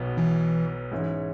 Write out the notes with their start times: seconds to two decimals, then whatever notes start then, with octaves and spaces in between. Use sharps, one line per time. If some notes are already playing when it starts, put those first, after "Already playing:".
Already playing: B1 B2 F#3 B3
0.17 E3
0.91 G#2 E3 C#4